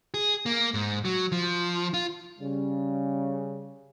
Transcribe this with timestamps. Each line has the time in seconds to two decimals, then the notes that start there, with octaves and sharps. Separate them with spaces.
0.14 G#4
0.46 A#3
0.74 G#2
1.05 F#3
1.32 F3
1.94 F4
2.39 C#3 G3